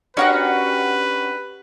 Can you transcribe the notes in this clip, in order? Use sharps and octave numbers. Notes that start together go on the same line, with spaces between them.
C#4 D4 F#4 G4 A#4 B4 F#5